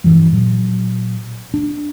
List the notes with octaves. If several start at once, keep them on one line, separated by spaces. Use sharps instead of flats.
G2 E3 F3 G3
A#2 F#3
D4